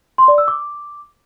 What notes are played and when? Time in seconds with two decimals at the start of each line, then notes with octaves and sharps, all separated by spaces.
0.18 C6
0.28 D5
0.38 E6
0.48 D6